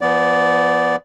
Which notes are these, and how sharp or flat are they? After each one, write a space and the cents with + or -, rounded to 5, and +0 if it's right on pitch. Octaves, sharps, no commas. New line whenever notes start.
F3 -40 B3 +0 D5 -15